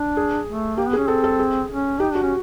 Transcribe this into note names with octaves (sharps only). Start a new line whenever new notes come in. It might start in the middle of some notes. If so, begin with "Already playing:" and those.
Already playing: D4
G#4
A3
A#3 G4
B3
G#4
C#4
C4 A4
A4
G#4
C#4
D#4 G4
D4 F#4
C#4